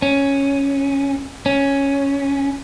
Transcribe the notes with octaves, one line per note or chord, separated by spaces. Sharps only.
C#4
C#4